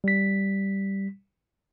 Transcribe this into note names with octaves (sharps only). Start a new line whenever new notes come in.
G3 B6